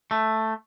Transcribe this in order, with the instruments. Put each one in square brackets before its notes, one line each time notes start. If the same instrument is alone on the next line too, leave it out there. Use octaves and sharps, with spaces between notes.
[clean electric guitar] A3